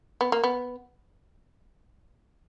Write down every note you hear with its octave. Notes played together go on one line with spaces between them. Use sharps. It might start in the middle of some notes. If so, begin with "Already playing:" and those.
B3
A#3
B3